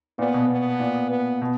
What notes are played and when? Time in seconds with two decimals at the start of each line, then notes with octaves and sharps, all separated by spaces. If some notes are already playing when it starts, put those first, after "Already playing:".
0.19 A#2 B3
0.34 B2
0.50 B3
0.80 A#2
1.10 B3
1.41 B2